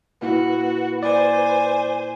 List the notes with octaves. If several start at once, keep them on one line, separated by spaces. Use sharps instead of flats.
A#2 E4 F#4 B4
C5 D5 G#5